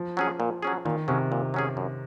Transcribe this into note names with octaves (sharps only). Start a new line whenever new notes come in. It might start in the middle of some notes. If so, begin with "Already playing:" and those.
Already playing: F3
F#3 C#4 G#4
A#2
F#3 C#4 G#4
A#2 D#3
C3 F#3 C#4 G#4
A#2
F#3 C#4 G#4
F#2